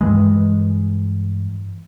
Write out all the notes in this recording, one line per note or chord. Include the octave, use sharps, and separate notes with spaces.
G2 E3 G#3